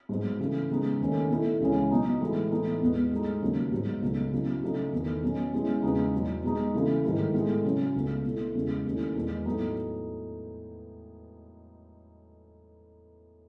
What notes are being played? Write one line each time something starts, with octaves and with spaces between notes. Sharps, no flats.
G#2 F#3 B3
C#3 E3 A3
C#3 G#3 B3 D#4
D#2 D#3 A3 C#4
B2 A3 E4
C#2 C#3 E3 G#3 C#4
B2 F#3 B3 D#4
A2 E3 G#3
A2 E3 B3 D#4
E2 B2 G#3 B3
A2 G#3 D#4
D#2 C#3 F#3
G#2 F#3 B3 D#4
C#2 B2 F#3 A3 D#4
C#3 F#3 B3 E4
C#3 F#3 A3 D#4
E2 D#3 A3 D#4
B2 F#3 C#4
B2 G#3 C#4 E4
E2 C#3 G#3 B3 D#4
E2 B2 F#3
B2 G#3 D#4
C#3 E3 A3 E4
G#2 D#3 A3 E4
A2 G#3 B3 E4
C#3 F#3 C#4
C#2 B2 A3
B2 A3 E4
E2 C#3 G#3
D#2 D#3 A3 C#4 E4
E2 B2 G#3
A2 F#3 B3 D#4